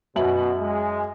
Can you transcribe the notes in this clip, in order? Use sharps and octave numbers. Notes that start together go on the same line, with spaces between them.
F#2 B2 E5 F#7
G#3